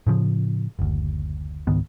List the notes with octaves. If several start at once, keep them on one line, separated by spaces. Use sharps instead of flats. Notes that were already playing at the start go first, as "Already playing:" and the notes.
A2 C#3 F3
F#1 D2
C#2 G#2 D#3 B3